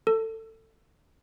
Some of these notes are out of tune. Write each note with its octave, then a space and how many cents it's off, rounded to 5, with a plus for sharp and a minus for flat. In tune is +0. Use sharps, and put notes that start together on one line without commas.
A4 +25